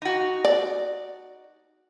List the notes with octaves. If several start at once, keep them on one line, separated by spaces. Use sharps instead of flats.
D#4 F#4
D5